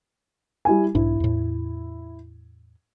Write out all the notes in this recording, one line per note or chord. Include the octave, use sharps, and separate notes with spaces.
G3 E4 G#5
B1 G#2 D4 E4
E2 A2